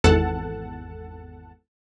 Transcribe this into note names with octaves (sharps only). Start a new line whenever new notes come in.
G#1 E2 A4 F#5 A5